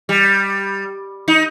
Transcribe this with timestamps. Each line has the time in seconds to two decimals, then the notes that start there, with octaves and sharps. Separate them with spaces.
0.09 G3
1.28 D#4